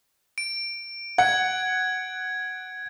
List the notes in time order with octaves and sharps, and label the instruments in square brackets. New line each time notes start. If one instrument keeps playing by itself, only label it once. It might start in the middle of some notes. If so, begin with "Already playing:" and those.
[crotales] D7
[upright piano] F#5 [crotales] G#6